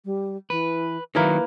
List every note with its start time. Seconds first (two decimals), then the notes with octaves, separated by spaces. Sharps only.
0.05 G3
0.50 E3 B4
1.15 D#3 F#3 A#3 E4 A#4 B4